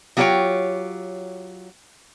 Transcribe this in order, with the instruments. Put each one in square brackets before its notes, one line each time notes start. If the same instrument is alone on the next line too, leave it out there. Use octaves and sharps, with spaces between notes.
[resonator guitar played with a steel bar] F#3 F4 G4 G#4 C#5 G5